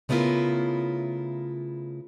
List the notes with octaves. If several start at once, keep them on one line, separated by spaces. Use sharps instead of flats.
C#3 A3 B3 E4 F4 A#4